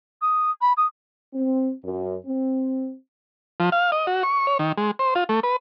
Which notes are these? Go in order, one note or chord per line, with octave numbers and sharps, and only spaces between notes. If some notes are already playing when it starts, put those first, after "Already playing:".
D#6
B5
D#6
C4
F#2
C4
F3
F5
D#5
F#4
C#6
C#5
D#3
G#3
C5
F4
A3
B4